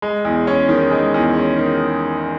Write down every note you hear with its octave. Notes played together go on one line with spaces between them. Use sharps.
G#3
E2
C#4
D#3
G#3
E2
C#4
D#3